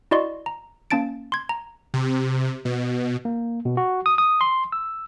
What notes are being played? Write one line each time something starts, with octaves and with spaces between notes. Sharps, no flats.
E4 F#4 D5 D#5 C6 C#6
A#5
A#3 C#4 A5 A6 D7
C6 G#6
A#5
C3
B2
A#3
B2
F#4
D#6
D#6
C6
E6